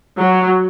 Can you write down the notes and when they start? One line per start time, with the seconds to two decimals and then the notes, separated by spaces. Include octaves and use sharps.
0.20 F#3